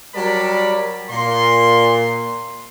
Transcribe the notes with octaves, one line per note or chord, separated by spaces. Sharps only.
F#3 G3 A#4 D5 A5 B5
A#2 C6